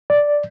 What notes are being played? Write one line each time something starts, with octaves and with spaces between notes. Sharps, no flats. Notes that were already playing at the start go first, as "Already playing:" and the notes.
D5